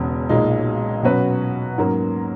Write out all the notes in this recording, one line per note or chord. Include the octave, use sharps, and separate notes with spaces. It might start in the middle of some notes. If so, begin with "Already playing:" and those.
Already playing: E1 E2 C#3
B1 A#2 G#3 D#4
B2 F#3 C#4 F#4 B4
G#2 F#3 A#3 C#4